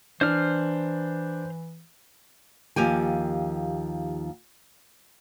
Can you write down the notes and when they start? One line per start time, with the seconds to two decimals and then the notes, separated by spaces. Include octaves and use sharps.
0.21 E3 D4 C5 F6
2.76 D#2 F3 G4 G#5